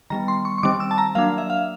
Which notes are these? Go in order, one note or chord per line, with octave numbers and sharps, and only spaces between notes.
D#3 G3 B3 A#5
C6
C#6
C#6
D#3 G3 C4 D6
E6
A5
A#5
F#3 A#3 D4 F5
E5
F5